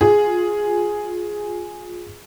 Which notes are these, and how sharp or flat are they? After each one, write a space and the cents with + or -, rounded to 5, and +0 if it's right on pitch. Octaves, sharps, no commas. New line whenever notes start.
F4 +20 G#4 +0